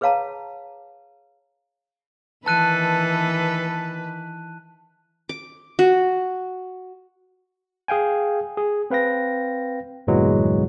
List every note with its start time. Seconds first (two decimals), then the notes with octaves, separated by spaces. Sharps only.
0.01 G#4 B4 C#5 F5 A5 A#5
2.46 D#3 E3 A4 B4 A5 F#6 D#7
5.29 D6
5.79 F#4
7.88 G#4 F5 G5 G#5
8.57 G#4
8.90 C4 B4 F5 G5 A#6
10.07 G1 E2 A#2 E3 F#3 G#3